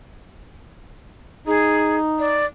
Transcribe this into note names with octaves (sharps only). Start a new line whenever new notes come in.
D#4 G#4
D5